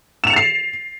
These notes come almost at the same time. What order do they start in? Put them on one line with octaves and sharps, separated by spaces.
E7 F7 C#7 A6 C7